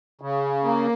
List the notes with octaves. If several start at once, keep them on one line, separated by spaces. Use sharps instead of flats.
C#3
A#3